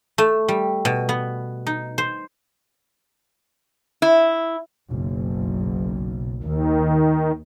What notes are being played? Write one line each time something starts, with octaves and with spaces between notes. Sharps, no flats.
A3
G3
B2
B3
D#4
C5
E4
F#1 B1
D#2 D#3